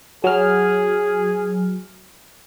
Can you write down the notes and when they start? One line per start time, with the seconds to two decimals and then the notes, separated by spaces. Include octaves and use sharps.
0.24 F#3 G#4 F6